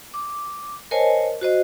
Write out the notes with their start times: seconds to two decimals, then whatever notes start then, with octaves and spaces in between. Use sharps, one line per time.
0.14 D6
0.91 A#4 C5 C#5 D#5 G#5 A5
1.41 F#4 C5 D#5